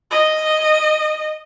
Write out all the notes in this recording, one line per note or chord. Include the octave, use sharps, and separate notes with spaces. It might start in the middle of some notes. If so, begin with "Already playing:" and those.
D#5